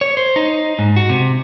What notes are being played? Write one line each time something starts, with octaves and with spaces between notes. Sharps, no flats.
C#5
C5
D#4
G#2
F#4
C3